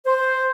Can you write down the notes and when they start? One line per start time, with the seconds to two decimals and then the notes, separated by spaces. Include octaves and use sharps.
0.06 C5